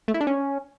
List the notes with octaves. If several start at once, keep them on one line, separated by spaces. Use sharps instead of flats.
A3
E4
D4
C#4